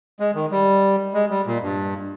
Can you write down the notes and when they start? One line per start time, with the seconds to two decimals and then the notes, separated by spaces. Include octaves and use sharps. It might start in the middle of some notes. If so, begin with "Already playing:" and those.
0.20 G#3
0.35 D#3
0.51 G3
1.14 G#3
1.30 G3
1.47 A#2
1.62 G2